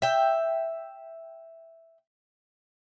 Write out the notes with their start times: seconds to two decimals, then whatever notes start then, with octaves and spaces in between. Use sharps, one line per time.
0.02 E5 G5